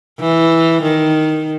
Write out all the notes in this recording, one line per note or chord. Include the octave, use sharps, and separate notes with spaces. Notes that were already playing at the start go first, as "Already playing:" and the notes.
E3
D#3